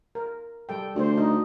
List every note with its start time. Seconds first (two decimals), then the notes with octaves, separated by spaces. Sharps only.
0.15 A#4
0.69 G3 A4 G5
0.95 D2 D4 C5
1.17 D#4